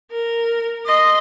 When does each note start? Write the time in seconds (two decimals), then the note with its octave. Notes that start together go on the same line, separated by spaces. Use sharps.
0.11 A#4
0.85 D#5 C6